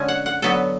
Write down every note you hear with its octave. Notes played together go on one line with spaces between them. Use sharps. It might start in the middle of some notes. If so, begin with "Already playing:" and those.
Already playing: D3 G#3 C#4 G#5
F#5
F#5
D3 F#3 B3 A4